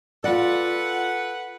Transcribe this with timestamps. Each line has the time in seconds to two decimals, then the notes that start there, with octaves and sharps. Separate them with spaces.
0.24 F4 A4 B4 D5 F#5